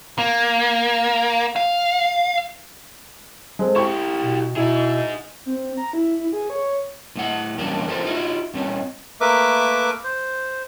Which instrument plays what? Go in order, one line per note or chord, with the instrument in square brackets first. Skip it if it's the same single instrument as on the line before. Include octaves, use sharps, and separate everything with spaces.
[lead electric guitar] A#3
F5
[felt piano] G#3 C4 A4
[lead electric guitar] E4 G4 [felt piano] C#6
[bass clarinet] B2
[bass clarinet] B2 [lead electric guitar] D#4 G#4 [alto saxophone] E4
[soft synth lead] C4
A#5
E4
E4
G#4
C#5
[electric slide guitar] A2 A3 F#5
E2 G2 F#3 A#3 C#4 D4
F3 A3 A4 A#4 C5
D#4 F4 F#4 E5
G2 C4 C#4
[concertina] A3 A#3 A#4 B4 E5 D6
C5